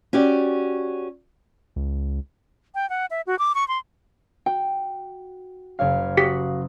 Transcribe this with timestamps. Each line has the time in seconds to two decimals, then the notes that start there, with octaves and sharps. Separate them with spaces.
0.13 C#4 F#4 G4 D5
1.76 C#2
2.75 G5
2.90 F#5
3.11 E5
3.27 F#4
3.39 D6
3.55 C#6
3.68 C6
4.46 F#4 G5
5.79 F#1 C#5 F5
6.17 F#4 G4 D#6 F#6 B6 C7